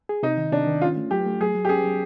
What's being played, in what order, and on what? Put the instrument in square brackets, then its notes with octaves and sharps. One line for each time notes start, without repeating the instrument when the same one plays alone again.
[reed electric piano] G#4
[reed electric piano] C3 [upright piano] D#4
[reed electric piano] D#3
[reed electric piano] C3 [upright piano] D4
[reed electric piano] D#3
[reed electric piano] C#4 [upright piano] F4
[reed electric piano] A3
[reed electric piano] F#3 [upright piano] G4
[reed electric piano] A3
[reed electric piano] F#3 [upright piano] G#4
[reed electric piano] F#3
[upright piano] G4
[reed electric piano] C#4 [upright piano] G#4
[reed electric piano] F#3